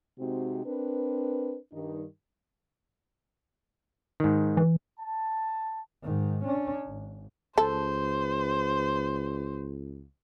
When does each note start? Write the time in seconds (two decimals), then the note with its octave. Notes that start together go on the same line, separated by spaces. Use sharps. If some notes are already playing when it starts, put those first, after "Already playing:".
0.19 C3 G#3 C4 D#4 F#4
0.66 C4 D4 A#4 B4
1.73 G2 D#3 D#4
4.20 G#2 D#3
4.57 E3
4.98 A5
6.03 G#2 D#3
6.45 C#4 D4
6.87 G#1
7.58 C#2 A4 C5